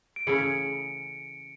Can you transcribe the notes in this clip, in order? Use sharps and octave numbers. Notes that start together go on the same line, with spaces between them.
D7
C#3 E3 A3 C#4 G#4 C#7